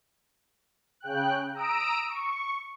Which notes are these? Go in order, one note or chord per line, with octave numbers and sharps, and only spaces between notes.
C#3 G5 F#6
A#5 D#6 E6 D7
C#6